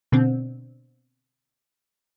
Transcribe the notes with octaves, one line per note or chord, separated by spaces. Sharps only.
B2 D3 C4